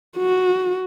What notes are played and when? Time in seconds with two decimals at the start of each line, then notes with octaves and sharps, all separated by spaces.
0.17 F#4